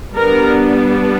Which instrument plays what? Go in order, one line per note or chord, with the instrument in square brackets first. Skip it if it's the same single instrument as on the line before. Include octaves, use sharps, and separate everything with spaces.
[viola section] G3 B3 D4 A#4